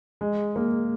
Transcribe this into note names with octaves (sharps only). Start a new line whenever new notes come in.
G#3
A#3